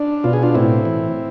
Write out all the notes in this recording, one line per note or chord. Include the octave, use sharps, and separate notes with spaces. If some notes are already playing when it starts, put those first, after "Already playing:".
Already playing: D4
B2 F4
G#4
D4 F4
A2 C4 E4
E3